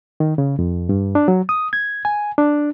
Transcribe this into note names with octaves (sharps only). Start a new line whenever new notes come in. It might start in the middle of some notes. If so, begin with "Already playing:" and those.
D#3
C#3
F2
G2
D4
F#3
D#6
G#6
G#5
D4